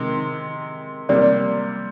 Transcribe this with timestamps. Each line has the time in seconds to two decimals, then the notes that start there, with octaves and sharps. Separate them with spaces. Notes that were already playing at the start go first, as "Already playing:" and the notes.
Already playing: C3 D#3 G#3
1.09 C3 G3 A#3 D5